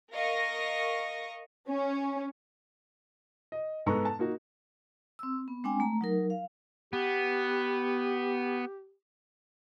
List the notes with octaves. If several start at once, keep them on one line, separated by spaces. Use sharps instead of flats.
A#4 D#5 F5 C#6 A#6
C#4
D#5
G#2 G#3 B3 A4 A#5 C#6
A5
A#3 D#4 F#4
C4 E6
B3
G#3 C4 D4 G5 G#5
A3 A#5
F#3 D#4 A#4
F5
B3 G4